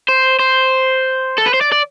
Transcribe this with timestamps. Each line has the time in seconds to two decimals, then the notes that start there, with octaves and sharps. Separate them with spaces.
0.09 C5
0.39 C5
1.38 A4
1.46 B4
1.54 C5
1.61 D5
1.72 D5